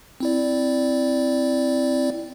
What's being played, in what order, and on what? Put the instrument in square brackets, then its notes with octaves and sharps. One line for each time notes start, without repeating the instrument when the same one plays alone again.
[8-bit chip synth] C4 E4 D5